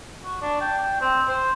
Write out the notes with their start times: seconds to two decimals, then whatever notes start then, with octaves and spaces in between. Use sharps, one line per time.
0.25 F#4
0.42 D4
0.61 G5
1.01 C4
1.28 C5